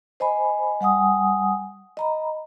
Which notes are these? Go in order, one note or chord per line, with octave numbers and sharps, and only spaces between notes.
C5 D#5 G#5 B5
G3 F#5 G#5 D#6
D#5 A#5 B5